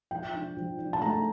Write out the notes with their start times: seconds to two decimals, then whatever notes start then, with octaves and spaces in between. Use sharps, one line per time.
0.11 F3 G5
0.34 D4
0.57 F3
0.79 D4
0.93 A5
1.01 A3 A#5